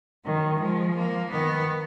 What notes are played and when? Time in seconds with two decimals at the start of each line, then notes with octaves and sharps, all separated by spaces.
0.25 D#3 F#3
0.60 F3 G#3
0.97 A#3
1.31 D#3 B3